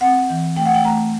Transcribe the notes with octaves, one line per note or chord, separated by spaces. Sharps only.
C4 F#5
E3
A3 G5
F#5
G5
A3 A#5